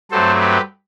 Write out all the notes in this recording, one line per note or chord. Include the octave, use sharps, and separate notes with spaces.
G2 F#3 A3 C4 A4 C5
G4 B4